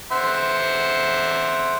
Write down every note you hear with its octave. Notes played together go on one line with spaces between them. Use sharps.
C5 E5 F#5